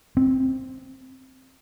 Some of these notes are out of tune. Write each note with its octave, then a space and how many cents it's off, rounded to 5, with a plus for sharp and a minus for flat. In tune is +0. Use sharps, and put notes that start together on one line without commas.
C4 +5